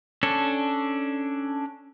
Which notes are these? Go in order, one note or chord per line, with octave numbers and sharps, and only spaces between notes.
C#4 D4 A4